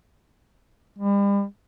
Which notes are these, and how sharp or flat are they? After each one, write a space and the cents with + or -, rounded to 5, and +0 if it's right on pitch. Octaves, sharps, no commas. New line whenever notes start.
G3 +40